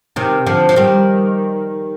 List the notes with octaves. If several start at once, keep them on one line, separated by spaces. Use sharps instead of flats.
C3 D#3
D3 F3
F3
D#3 G3